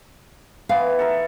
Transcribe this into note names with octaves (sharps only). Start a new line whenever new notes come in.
E3 B3 F5
A4 A#4 E5